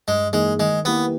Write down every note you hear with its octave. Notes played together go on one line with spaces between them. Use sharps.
G2 G#3
E3 G#3 A#3 D#4 G#4
D#3 G#3
A#3 B3 E4 G4 B4